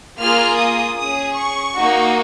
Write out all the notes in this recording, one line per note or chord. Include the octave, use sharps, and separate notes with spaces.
A#3 F4 G#4 F6
D#6
C#4 G#4 D#6
C#6
A#3 D#4 F#4